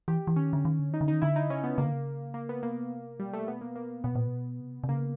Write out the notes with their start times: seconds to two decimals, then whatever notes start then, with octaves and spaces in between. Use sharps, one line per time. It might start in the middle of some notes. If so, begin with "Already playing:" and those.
0.08 E3 G4
0.27 E3
0.36 D#3 C#4
0.53 D3
0.65 D#3
0.79 D3
0.91 D#3 D#4
1.01 D3
1.08 D#3 D#4
1.22 D3 E4
1.36 D#4
1.50 C#3 C#4
1.64 B3
1.78 C#3 A#3
1.85 D3
1.92 C#3
2.34 A#3
2.49 B3
2.63 C3 A#3
3.19 B2 G3
3.31 C3 A3
3.42 B2
3.48 B3
3.61 A#3
3.76 A#3
4.04 B2 B3
4.15 A#2
4.27 B2
4.60 C3
4.84 C3
4.89 C#3 A#3